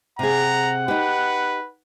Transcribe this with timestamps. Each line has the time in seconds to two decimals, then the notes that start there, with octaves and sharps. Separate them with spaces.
0.19 C3 G#4 F#5 A#5
0.88 D#4 G4 B4